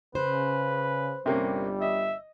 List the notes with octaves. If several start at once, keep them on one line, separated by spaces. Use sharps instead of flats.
C#3 B4 C5
G1 C3 G3 A#3 C#4
D#5 E5